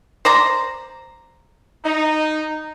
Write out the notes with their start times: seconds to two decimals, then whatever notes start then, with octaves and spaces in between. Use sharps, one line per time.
0.25 C5 D5 A#5
1.85 D#4